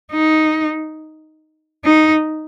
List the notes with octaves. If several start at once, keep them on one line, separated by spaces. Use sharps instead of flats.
D#4
D#4